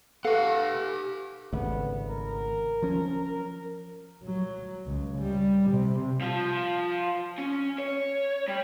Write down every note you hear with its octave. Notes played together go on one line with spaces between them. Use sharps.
G4 A4 B4 F5 F#5
G#1 C#3 A3 B3
A#4
F3 C#4
A#4
F#3
C#2
G3
C3
F3 F4
C#4
C#5
G3